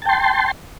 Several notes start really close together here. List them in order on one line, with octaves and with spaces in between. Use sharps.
A5 G5 C6